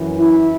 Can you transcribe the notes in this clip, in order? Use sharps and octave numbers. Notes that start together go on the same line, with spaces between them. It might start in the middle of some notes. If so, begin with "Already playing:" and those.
Already playing: F#2 E3
E4